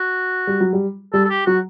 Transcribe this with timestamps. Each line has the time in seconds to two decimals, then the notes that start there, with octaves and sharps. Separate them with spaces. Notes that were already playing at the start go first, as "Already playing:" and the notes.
Already playing: F#4
0.47 G3
0.60 F#3
0.73 G3
1.13 G3 A4
1.25 A4
1.30 G4
1.46 F#3 F#4